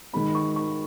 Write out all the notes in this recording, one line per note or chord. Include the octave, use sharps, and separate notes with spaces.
D#3 G#3 D#4 B5
C#6
C#6